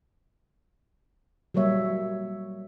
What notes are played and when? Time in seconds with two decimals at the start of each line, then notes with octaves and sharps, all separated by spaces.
1.54 F#3 G3 A#3 C#5 E5